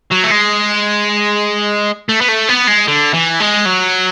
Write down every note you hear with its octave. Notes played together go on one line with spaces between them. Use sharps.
F#3
A3
G#3
A3
B3
A3
B3
G#3
D3
E3
G#3
F#3